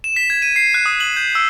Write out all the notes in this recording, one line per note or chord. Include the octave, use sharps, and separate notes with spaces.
E7
B6
G#6
D#7
C7
F#6
D#6
F#7
G6
E6